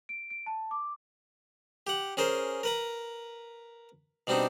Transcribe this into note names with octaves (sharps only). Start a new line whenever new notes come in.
D7
D7
A5
D6
G4 F#5
C#4 G#4 A#4 C5
A#4 B4 A#5
B2 G3 C4 D4 D#4